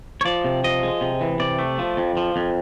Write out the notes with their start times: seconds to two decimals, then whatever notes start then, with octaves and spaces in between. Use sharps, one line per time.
0.21 C#5
0.25 F3 D5
0.44 C3
0.64 F3 D#5
0.83 G#3
1.01 C3
1.21 E3
1.40 C3 D5
1.59 A3
1.79 F3
1.97 F2
2.17 F3
2.36 F2